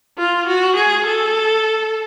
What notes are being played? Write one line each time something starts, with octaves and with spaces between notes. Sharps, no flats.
F4
F#4
G#4
A4